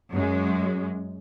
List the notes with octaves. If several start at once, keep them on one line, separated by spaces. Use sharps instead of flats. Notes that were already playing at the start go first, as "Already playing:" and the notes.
F#2 G#3